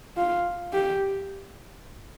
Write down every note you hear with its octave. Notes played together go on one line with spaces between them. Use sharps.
F4
G4